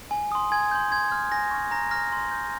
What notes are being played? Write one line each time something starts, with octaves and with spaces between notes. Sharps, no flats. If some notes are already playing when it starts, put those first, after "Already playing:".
G#5
C6 D#6
G#5 G#6
C6 G6
C6 G#6
F6
G#5 A#6
C#6 F6
A#5 A#6
C#6 F6 A#6
C6
G6